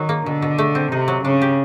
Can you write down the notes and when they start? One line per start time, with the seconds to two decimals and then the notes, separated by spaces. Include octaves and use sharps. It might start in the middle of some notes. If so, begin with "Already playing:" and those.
Already playing: D#3 F#3
0.09 A#3
0.26 B2 D3
0.42 B2
0.58 A3
0.75 C4
0.92 C3 D#4
1.08 F#3
1.25 C#3 D4
1.42 G4